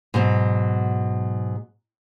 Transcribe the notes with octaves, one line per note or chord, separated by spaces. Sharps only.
G#2 B2 F#3